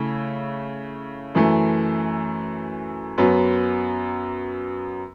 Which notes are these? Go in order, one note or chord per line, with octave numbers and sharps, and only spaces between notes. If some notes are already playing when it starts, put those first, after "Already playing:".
Already playing: C#3 A3 E4
F#2 E3 A3
F#2 F#3 B3